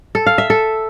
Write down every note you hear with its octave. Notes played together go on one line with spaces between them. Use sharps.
A4
F5
E5
A4